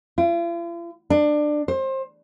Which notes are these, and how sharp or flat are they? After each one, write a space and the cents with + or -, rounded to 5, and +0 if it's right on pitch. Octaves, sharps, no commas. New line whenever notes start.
F4 -45
D4 +20
C5 +25